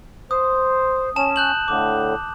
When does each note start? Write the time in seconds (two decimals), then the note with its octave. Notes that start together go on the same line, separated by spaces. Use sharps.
0.31 C5 D#6
1.16 C#4 A5 E7
1.36 F#6 G6 F#7
1.68 A2 D3 D6